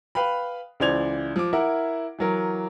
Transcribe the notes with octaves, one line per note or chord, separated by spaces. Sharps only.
B4 F5 G5 B5
C#2 E3 C5 D5 G#6 F7
F3 D6
E4 A#4 E5 F#5
E3 F#3 A#4